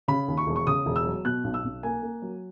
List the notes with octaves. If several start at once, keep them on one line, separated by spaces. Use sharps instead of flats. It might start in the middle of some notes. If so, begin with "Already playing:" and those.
C#3 B5
D#2
C#6
E1
C#6
C#3 D#6
E1
E6
F#3
B2 F#6
B1
E6
B1
A#3 G#5
A#3
F#3